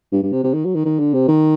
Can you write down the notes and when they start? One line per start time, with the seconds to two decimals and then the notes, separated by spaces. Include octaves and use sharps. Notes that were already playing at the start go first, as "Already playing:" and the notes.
0.12 G2
0.22 G2
0.32 C3
0.43 C3
0.54 D#3
0.65 F#3
0.75 D#3
0.85 D#3
0.99 D3
1.14 C3
1.28 D#3